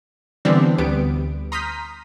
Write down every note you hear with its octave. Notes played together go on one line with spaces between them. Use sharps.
D3 E3 G3 B3 C4 D4
D2 G3 B3 D7
A#5 C6 D#6 F6 G6 B6